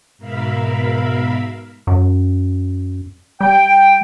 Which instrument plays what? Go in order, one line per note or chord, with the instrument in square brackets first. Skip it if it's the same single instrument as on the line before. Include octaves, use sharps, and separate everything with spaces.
[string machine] G#2 B2 A#4 E5 F5 B5
[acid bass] F#2
[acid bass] G3 [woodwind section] G5